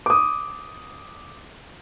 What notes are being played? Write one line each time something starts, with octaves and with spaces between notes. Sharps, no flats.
D6 D#6